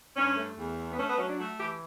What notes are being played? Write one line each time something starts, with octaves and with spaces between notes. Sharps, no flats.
G2 C#4
A3
E2
A3
B3
A3 C#4
B3
F#3 C#4
D4
A3 F#4
E3 G4